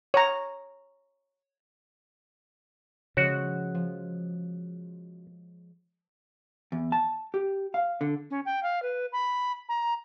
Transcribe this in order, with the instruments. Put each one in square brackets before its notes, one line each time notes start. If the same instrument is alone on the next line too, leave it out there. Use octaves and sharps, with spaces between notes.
[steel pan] C#5 A#5
[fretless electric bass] C#3 [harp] F3 G#3 [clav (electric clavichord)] F#4 [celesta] C#5 F#6
[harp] F3
[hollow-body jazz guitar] E2
A5
G4
F5
D3
[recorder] C#4
G5
F5
B4
B5
A#5